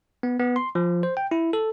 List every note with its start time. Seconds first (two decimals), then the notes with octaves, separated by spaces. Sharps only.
0.23 B3
0.40 B3
0.56 C6
0.75 F3
1.03 C5
1.17 G5
1.31 E4
1.53 A4